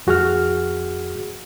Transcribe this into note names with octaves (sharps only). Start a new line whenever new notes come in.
F2 F#4 G#4 F#5 F6